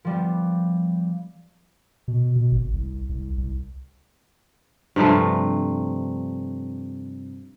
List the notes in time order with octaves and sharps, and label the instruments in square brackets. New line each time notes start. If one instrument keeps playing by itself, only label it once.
[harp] F3 G3 B3
[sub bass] B2
B2
G#1
C2
C2
C2
[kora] G2 C3 F3 A3